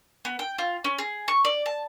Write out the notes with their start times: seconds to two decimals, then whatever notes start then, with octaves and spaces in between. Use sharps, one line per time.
0.25 B3
0.39 G5
0.58 F4
0.84 C#4
0.98 G#4
1.28 C#6
1.45 D5
1.66 A5